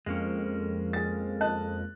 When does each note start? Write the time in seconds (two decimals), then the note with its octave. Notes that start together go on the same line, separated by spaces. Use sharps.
0.06 F2 G#3 A#3 C#4
0.93 G#4 A6
1.41 D#5 A5 F#6